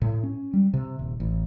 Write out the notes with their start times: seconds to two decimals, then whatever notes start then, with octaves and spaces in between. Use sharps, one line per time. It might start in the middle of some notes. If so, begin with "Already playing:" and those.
0.02 A2
0.23 C#4
0.53 G3
0.73 C3
0.99 D#1
1.20 A1